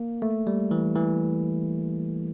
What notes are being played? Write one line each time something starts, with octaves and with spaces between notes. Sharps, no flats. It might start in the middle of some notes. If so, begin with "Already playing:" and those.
Already playing: A#3
A3
G3
E3
E3